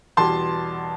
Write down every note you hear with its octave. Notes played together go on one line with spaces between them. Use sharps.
E2 B2 G3 A5 C6